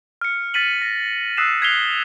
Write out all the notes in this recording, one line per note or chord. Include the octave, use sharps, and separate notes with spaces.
F6 C#7
F6 A6 B6 D#7 F#7
A#6
D#6 E6 F#6 B6 C7 E7
G#6 B6 C7 F7 G7